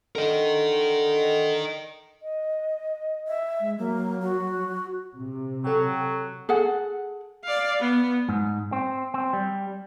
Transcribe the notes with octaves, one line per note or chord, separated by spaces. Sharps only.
D3 A#4 D#5
D#5
E5
G#3
F#3 A#3
F#4
C3
F#3 A4 G5
G#4 A4 F#5
D5 F5
B3
G#2
C4
C4
G3